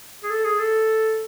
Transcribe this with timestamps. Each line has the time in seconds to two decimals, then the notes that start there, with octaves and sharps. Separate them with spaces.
0.24 G#4
0.30 A4
0.44 G#4
0.59 A4